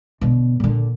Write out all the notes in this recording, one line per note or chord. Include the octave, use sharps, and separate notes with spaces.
B2 D3
A#2 D3